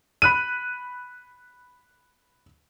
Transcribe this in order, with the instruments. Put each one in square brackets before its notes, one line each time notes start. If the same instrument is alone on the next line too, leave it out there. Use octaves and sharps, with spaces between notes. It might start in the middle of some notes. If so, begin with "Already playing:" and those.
[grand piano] B5 F#6 D#7